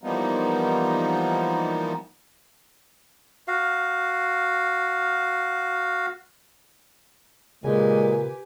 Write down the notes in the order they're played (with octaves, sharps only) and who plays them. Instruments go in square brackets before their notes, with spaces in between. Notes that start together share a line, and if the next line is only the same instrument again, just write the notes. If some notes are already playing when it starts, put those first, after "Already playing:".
[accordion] E3 F3 G3 A#3 B3 D#4
[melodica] F#4 F5
[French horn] A#2 [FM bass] C#3 [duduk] G#3 [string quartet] G4 B4 G#5